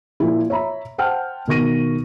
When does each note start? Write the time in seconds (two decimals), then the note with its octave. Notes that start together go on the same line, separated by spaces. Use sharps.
0.20 A#2 F3 E4
0.50 C#5 E5 A#5 B5
0.98 C5 F#5 G5 A5 F6
1.47 B2 D#3 C#6 A#6 D#7